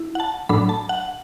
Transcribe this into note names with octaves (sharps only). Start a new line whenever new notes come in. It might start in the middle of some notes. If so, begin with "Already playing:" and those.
Already playing: E4
F#5
A5
A2 F#3 D4 B5
A5
F#5